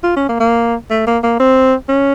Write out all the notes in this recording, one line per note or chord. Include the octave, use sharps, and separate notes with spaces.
F4
C#4
A#3
A#3
A3
A#3
A#3
C4
C#4